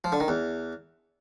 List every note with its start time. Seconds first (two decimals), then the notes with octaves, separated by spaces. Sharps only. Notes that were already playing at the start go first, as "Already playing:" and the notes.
0.04 F3
0.12 D3
0.20 D#3
0.28 E2